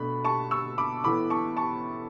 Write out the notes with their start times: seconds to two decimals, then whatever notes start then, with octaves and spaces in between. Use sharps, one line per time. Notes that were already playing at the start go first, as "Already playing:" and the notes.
Already playing: B2 A3 D4 B5
0.24 A5 C#6
0.51 C#6 E6
0.78 B5 D6
1.04 A2 E3 B3 B5 D6
1.30 A5 C#6
1.57 A5 C#6